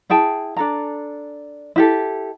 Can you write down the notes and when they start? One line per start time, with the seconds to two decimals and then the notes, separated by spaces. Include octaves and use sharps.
0.10 E4 G#4 G5 A5
0.57 D4 A4 A#5
1.76 E4 G4 A4